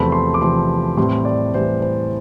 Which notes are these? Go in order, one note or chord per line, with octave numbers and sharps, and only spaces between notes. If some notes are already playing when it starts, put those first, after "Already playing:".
Already playing: E2 C3 F3 A3 C4 B5
C6
D6
E2 C3 F3 A3 C4 C6
A2 E3 G3 C4 C6
D5
A2 E3 G3 C4 C5
C5